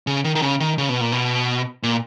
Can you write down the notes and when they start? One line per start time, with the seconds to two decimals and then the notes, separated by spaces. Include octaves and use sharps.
0.07 C#3
0.24 D#3
0.35 D#3
0.42 C#3
0.60 D#3
0.78 C#3
0.89 B2
1.01 A#2
1.12 B2
1.83 A#2